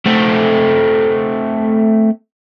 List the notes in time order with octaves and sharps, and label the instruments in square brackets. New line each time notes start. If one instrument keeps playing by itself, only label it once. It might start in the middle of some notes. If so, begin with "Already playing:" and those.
[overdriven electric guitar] A3 C4